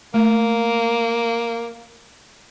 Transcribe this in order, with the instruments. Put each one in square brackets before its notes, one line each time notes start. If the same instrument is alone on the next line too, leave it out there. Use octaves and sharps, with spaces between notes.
[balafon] A3 [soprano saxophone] A#3